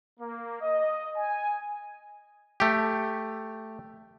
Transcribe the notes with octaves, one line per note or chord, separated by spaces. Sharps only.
A#3
D#5
G#5
A3 G4